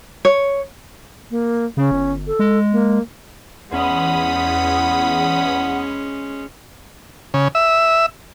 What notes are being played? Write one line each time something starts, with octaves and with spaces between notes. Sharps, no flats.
C#5
A#3
C#3 C#4
G1
A4
G#3
A#3
E2 G#3 C#4 F#5 B5 D#6
C#3
E5